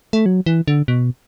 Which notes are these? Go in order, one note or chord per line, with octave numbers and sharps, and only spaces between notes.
A3
F#3
E3
D3
B2